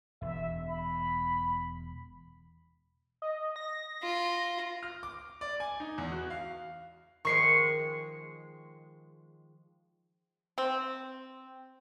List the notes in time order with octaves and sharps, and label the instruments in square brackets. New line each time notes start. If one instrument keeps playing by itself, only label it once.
[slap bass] E1 [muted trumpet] E5
[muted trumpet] B5
[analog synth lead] D#5
A#6
[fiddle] F4
[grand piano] F6
D6
D5
G#5
D#4
E2
F#4
F5
[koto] D#3 F3 G#3 [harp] C#6 C7 C#7
[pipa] C4